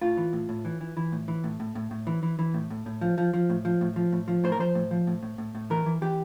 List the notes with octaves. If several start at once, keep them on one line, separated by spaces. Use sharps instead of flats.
A2 F4
E3
A2
A2
E3
E3
E3
A2
E3
A2
A2
A2
A2
E3
E3
E3
A2
A2
A2
F3
F3
F3
A2
F3
A2
F3
A2
F3
A2 C5
A#4
F3 C5
A2
F3
A2
A2
A2
A2
E3 A#4
E3
E3 G4